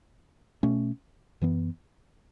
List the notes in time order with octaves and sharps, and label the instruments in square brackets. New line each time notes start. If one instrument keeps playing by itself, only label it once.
[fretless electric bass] B2 A3 C#4
F#2 E3 B3